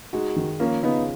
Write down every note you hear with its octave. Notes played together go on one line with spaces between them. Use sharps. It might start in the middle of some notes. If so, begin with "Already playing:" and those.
G#3 D#4 F#4
D#3
F3 A#3 C#4
C#3 B3 D#4